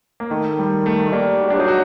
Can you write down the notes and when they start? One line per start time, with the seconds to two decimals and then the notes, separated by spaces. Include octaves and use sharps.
0.20 A#3
0.30 D#3 A3
0.59 G3
0.86 A3
1.13 G3 A#3
1.41 F#4
1.48 G3
1.50 D4
1.55 F#3 D#4
1.68 F#4